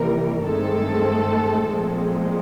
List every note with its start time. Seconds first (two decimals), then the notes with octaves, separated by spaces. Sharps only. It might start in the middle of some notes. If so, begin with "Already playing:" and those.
Already playing: C3 E3 G3 A#3 A#4
0.43 G2 D#3 G#3 A3 C4 A4
1.65 A#2 F3 G#3 C4